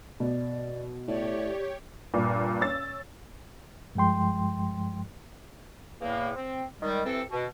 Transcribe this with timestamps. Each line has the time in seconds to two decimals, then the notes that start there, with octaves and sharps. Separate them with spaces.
0.20 B2 D5
1.08 A2 G4 C#5 D5
2.14 G2 A#2
2.61 C#4 E6 A6
3.95 G2 F3 G#3 G5 C6
6.01 E2 A2 A#3
6.35 C4
6.80 D#3 G3 G#3
7.05 C3 E3 C4 A4
7.31 B2